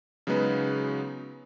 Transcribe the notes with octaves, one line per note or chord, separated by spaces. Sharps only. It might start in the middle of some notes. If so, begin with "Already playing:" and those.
C#3 F#3 G#3 B3 D#4 B4